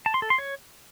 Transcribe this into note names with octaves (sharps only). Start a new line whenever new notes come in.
A5
C6
A4
C6
C#5